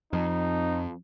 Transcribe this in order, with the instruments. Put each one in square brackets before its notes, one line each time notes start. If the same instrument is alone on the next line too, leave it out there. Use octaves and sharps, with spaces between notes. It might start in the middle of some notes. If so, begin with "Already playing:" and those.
[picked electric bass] F2 [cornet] D#4